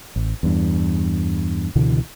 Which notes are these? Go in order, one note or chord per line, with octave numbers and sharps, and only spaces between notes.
A1
E2 G2
C#2 B2 D3 E3